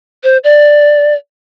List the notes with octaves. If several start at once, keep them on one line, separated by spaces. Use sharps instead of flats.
C5
D5